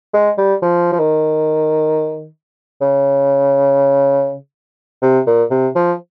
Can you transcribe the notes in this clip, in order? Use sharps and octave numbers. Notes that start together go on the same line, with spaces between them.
G#3
G3
F3
F3
D#3
C#3
C3
A#2
C3
F3